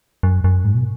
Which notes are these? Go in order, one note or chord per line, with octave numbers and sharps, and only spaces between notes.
F#2
F#2
G#2
B2